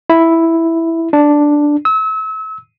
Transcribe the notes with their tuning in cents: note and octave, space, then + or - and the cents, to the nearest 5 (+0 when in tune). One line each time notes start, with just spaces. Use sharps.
E4 +0
D4 +0
E6 -35